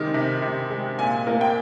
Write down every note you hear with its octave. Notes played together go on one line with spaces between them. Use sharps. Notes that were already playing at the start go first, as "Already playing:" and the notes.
Already playing: C3 D#3 G#3
C3
C3
G#3
A#2 G#5
A#3
G5